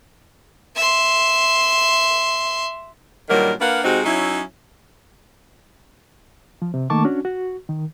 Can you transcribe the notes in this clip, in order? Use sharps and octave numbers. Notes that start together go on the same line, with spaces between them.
E5 C6
G2 A#2 D#3 F#3 G3 A#4
A#3 D4 B4 F5 F#5
C3 G#3 C4 D#4 F#4
F#3 C#4 D#4 E4
F3
C3
D#3 A3 A#3 A5 C#6 D6
C#4 D4 F#4
F#4
D#3